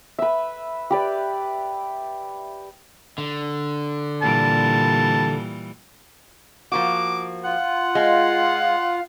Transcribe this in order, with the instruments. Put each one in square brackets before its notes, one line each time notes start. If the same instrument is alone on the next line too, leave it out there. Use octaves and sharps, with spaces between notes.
[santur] B4 E5
G4 B4 D5
[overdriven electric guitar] D3
[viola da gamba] A#2 E3 G3 [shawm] A5
[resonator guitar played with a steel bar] F3 A#3 F#4 [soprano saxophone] D6
[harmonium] F4 [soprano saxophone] F#5
[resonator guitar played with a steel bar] G#3 [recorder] F5